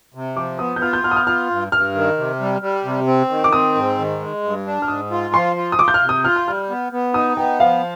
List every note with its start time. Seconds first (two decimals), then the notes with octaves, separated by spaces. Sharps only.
0.14 C3
0.36 F3 D6
0.59 B3 D#6
0.76 G6
0.82 F4 F6
0.93 G6
1.04 B3 F6
1.11 D#6
1.16 F6
1.27 F4 F6
1.50 G2
1.72 G2 F6
1.95 D#3
2.18 C3
2.40 G3
2.62 G3
2.85 C3
3.07 C4
3.30 D#3
3.44 D6
3.53 C4 D#6
3.75 G#2
3.98 D#3
4.20 G#3
4.44 G2
4.66 D4
4.82 F6
4.88 G#2 D#6
5.11 F4
5.34 F3 C6
5.56 F4
5.72 D#6
5.79 F4 D6
5.88 G6
5.94 F6
6.01 C3
6.09 D#6
6.24 F4 F6
6.36 G6
6.47 G3 F6
6.70 B3
6.92 B3
7.14 D#4 D#6
7.37 B3 G5
7.60 F3 F5